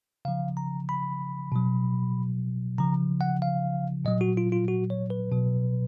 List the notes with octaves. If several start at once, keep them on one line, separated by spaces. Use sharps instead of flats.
C#3 F3 F5
A#5
B5
B2 F#3
C#3 F3 A#5
F#5
F5
A#2 F#3 D#5
F#4
F4
F4
F#4
C#5
B4
B2 F#3